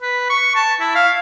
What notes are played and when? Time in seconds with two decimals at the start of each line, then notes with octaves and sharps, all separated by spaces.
0.02 B4
0.30 C#6
0.56 A5
0.81 E4
0.95 F5